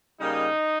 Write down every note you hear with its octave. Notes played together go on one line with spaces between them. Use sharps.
C#3 G3 A#3 D#4